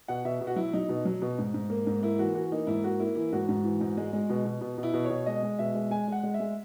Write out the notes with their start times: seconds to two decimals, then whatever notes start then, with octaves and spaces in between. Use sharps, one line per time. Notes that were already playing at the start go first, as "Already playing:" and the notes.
0.08 B2 F#5
0.25 B2 E5
0.41 B2
0.47 F#4
0.56 F#3 E4
0.73 F#3 D#4
0.89 B2
1.05 F#3
1.22 B2
1.38 G#2
1.54 G#2
1.70 A#3
1.87 G#2
2.03 A#3 E4
2.19 E3 F#4
2.35 E3 F#4
2.52 A#3 D#4
2.67 G#2 E4
2.84 A#3 F#4
3.00 A#3 E4
3.15 E3 E4
3.32 G#2 F#4
3.49 G#2
3.64 E3
3.81 G#2
3.97 G#3
4.13 G#3
4.30 B2
4.45 B2
4.61 B2
4.78 B2
4.83 E4
4.94 B2
5.05 C#5
5.10 B2
5.26 G#3 D#5
5.43 G#3
5.59 B2 E5
5.75 G#3
5.91 G#3 G#5
6.08 G#3 F#5
6.23 G#3
6.34 E5
6.40 G#3